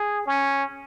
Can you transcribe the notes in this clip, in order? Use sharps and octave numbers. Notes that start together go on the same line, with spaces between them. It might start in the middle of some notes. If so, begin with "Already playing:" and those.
Already playing: G#4
C#4